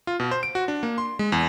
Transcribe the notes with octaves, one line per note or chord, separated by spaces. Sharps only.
F4
B2
C5
D7
F#4
D4
A#3
C6
G#3
E2